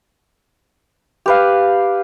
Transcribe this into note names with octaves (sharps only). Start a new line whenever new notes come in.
G4 B4 F5